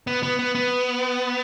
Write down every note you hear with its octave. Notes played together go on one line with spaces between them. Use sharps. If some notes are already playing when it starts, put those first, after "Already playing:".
B3
B3
B3
B3